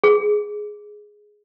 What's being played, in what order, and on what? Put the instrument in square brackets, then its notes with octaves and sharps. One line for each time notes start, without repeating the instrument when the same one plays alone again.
[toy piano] G#4